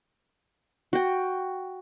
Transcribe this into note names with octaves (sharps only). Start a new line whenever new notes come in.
F#4 G5